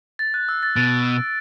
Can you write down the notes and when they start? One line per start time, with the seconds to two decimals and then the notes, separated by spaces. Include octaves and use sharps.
0.19 A6
0.34 F#6
0.49 E6
0.63 A6
0.76 B2 A6 D7